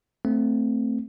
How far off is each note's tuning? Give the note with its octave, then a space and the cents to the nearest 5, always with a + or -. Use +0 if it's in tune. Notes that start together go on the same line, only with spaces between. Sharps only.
A3 +15 C4 +0